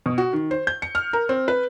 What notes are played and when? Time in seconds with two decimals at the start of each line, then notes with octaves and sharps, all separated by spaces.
0.06 B2
0.18 F#4
0.33 D#3
0.51 C5
0.67 G6
0.82 C#7
0.95 F6
1.13 A#4
1.29 C4
1.48 B4